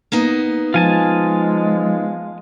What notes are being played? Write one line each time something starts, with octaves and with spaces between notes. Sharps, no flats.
A#3 B3 D#4
F3 G#3 F4 G#5 A5